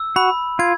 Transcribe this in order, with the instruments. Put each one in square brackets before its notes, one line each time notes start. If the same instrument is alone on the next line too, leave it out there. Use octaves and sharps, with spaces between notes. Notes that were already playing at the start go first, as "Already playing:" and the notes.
Already playing: [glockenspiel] E6
[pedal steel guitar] F#4 [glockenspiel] B5
[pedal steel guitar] F4 [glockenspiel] G#6